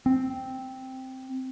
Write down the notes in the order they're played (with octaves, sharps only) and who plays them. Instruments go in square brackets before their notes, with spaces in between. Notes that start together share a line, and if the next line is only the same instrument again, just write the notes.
[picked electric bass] C4